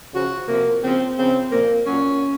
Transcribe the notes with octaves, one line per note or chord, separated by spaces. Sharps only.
C#3 F3 F#4
C3 F3 A#3
C#3 F3 C4
C#3 F3 C4
A#2 F3 A#3
A#2 F#3 C#4